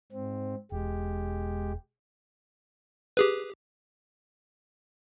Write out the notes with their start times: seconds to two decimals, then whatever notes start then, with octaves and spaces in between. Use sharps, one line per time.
0.12 G#2 C4
0.72 E1 G#3 G4
3.17 G4 G#4 B4